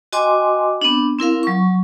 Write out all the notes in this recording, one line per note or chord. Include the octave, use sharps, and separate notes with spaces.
F#4 D#5 G5 G#5 C6 D6
B3 C4 D4
C4 E4 A#4 F5
F#3 C#6